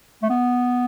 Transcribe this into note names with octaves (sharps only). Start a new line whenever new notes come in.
A3
B3